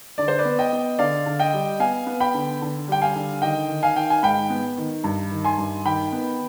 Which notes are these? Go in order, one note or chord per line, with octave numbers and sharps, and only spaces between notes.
D3 D5
C5
B4 D5
B3
D#5 G5
B3
D3 D5 F5
D3
D#5 G5
G3
B3 F5 G#5
B3
G5 B5
D3
D3
G3 G5
F5 G#5
D3
D#3 D#5 G5
D#3
F5 G#5
D#3 G5
G#5
G#2 G5 B5
B3
D#3
G2
D#3
G#5 C6
G2
D#3 G5 B5
B3